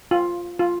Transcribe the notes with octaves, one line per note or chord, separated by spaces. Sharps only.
F4
F4